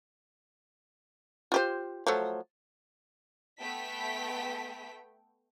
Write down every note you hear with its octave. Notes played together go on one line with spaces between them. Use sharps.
F4 G4 C5
F3 F#3 A3
A3 B3 G5 B6